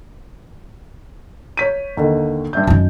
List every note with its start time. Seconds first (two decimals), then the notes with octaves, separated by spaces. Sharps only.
1.57 C#5 B6 D#7
1.97 D#2 D3 D#3
2.53 G2 E5 G6
2.67 F#2 D#3 A5